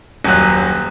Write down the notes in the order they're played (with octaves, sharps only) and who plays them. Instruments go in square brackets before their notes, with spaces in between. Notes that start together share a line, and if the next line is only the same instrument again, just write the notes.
[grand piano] D#1 F#2 F#3 F#6